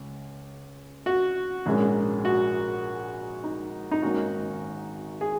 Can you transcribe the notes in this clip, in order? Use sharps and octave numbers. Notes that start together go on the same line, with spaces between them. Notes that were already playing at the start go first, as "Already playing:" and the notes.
Already playing: C#2
F#4
A#1 G#2 G#3 C#4
F#4
D#4
D#4
G#1 G#2 D#3 A#3 C#4 F#4
G#4